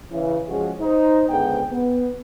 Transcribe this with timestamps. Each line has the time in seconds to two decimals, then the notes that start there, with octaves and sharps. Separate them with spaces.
0.11 C#3 E3
0.49 F3 G#3 C#4 F#4 G#4
0.80 D#4 C5
1.29 C#2 G#2 D3 B3 G#4 G5
1.71 B3